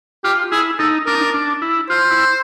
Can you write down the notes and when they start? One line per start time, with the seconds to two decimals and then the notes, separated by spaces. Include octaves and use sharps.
0.24 F4 G4
0.52 E4 G#4
0.79 D#4 A4
1.06 D4 A#4
1.15 D#4
1.21 D4
1.34 D4
1.62 E4
1.90 F4 C5
2.10 E4